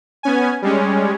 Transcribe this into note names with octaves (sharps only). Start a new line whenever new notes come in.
B3 C#4 G#5
G3 G#3 C#4